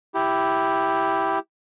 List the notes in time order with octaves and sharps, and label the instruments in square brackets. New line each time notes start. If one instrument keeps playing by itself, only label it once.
[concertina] E4 G4